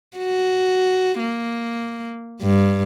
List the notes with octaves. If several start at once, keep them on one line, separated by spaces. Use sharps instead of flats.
F#4
A#3
G2